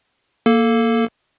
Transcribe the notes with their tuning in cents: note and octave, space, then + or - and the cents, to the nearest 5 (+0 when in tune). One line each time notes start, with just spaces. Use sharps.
A#3 +0 A4 +0